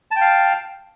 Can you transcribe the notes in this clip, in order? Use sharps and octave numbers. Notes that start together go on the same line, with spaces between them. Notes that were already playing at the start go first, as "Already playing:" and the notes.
F5 G5 A5